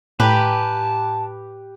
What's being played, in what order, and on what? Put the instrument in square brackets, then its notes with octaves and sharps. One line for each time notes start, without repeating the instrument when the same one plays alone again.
[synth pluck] A2 [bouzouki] G4 B4 [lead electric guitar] A5 A#5